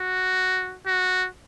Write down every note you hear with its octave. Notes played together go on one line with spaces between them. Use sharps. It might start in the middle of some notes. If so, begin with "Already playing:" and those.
Already playing: F#4
F#4